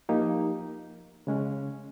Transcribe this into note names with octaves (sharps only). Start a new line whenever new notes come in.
F3 A#3 D#4 G4
C#3 G#3 C#4